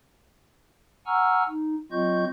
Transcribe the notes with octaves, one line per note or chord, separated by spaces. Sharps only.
F#5 G#5 A#5 C#6 E6 F6
D#4
F#3 C4 F4 D#5 C#6 G6